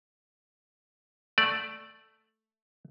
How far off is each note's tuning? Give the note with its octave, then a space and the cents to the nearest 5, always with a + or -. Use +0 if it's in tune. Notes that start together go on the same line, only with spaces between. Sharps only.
A3 +0 D5 +0